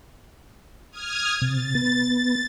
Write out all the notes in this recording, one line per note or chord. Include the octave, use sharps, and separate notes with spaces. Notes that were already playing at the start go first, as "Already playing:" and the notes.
D#6 F6 G#6
C3 A6
B3
A6